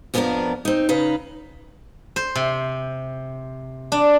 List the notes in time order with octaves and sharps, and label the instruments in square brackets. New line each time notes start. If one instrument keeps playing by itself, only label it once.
[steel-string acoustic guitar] F2 F3 B3 C#4 D4 A#4
C4 D#4
C#3 D#4 B4 F5
[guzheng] C5
C3
D4